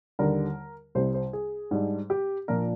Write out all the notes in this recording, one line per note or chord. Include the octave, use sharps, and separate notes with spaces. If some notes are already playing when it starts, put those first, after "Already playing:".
D#2 D3 G3 A#4
C2 C3 G3 C5
C5
G#4
G#2 G3 D4
G4
A#2 F3 A#3 D4 A#4